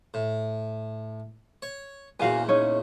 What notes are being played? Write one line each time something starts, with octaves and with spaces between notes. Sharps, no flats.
A2
C#5
E2 A#2 C#3 F#4 F5 G#5
C#4 D#4 C#5